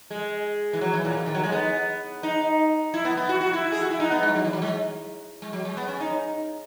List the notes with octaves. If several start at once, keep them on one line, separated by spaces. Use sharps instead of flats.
G#3
E3
F#3
E3
A#2
B2
D#3
F#3
G#3
B3
D#4
E4
B3
B3
F#4
F#4
E4
G#4
F#4
E4
D#4
B3
G#3
F#3
E3
F#3
G#3
G#3
F#3
G#3
B3
C#4
D#4